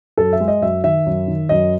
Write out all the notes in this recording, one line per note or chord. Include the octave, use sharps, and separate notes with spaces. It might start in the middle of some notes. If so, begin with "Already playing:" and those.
F#2 A4
E5
G#3
D#5
F#2 E5
D#3 E5
F#2
D#3
F#2 D#5